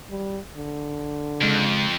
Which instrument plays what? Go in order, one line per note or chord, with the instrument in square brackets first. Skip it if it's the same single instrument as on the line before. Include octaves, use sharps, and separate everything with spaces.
[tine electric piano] G#1 [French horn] G3
[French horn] D3
[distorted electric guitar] F2 [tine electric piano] C#3 G#3